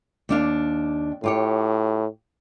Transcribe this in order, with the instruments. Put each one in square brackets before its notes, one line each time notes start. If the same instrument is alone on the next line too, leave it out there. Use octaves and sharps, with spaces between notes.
[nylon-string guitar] D#2 D4 F5
[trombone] A2 [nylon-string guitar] F4 G4 C#5